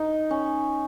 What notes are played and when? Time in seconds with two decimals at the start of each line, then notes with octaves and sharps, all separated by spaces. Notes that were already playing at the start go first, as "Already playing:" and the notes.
Already playing: D#4
0.30 C#4